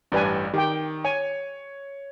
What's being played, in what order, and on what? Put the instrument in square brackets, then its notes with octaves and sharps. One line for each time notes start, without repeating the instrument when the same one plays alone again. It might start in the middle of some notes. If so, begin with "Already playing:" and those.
[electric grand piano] A1 G2 G3 [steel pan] D4 B4 G#5
[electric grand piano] D#3 [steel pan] G4 G5
[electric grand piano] C#5 [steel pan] G#5